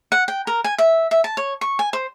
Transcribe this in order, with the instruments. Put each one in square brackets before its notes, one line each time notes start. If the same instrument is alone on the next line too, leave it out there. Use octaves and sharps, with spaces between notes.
[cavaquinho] F#5
G5
A#4
G#5
E5
E5
A5
C#5
C#6
G#5
C5